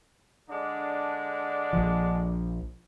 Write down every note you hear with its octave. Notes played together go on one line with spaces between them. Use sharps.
D3 G#3 D4
A#1 F3